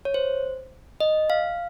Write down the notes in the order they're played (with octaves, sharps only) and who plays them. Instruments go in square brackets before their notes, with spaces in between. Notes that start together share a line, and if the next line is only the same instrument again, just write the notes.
[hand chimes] C#5
C5
D#5
F5